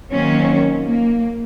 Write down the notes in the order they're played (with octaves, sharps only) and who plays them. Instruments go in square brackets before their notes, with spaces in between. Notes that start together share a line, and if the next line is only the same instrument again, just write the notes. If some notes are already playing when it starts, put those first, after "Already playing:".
[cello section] D#3 F#3 A#3 C4 C#4
A#3